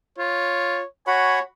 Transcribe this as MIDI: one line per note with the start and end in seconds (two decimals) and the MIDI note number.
0.18 0.81 65
0.18 0.87 73
1.07 1.39 66
1.07 1.42 73
1.07 1.39 78
1.07 1.39 80
1.07 1.39 83